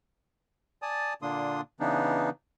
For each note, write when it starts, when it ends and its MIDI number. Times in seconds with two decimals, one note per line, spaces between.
0.82 1.14 74
0.82 1.14 80
0.82 1.14 81
0.82 1.14 87
1.22 1.61 46
1.22 1.61 50
1.22 1.61 58
1.22 1.61 62
1.22 1.61 84
1.22 1.61 87
1.80 2.30 49
1.80 2.30 52
1.80 2.30 59
1.80 2.30 62
1.80 2.30 63